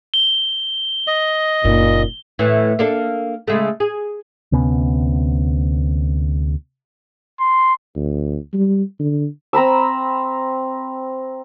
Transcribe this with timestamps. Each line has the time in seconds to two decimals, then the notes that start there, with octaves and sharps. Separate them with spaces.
0.14 G7
1.07 D#5
1.65 F#1 A#2 D#4
2.39 A2 E3
2.79 A#3 D4 A4
3.48 C#3 G#3 A3
3.80 G#4
4.52 D2 C3 B3 C#4
7.40 C6
7.96 D2
8.53 G3
8.99 D3
9.53 C4 A#5 B5 E6